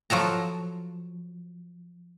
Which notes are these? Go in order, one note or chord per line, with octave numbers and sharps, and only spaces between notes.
F3 F#3 A4 A#5